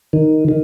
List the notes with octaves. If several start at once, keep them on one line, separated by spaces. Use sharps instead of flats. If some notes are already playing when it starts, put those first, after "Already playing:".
D#3
D#3